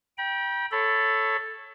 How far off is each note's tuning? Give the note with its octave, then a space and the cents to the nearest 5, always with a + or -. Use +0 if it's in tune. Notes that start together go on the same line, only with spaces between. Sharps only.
G5 +0 B5 -45
A4 +0 C#5 -5 B5 +25